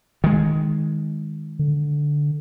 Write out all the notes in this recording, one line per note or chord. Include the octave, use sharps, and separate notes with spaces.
D#3 G#3
D3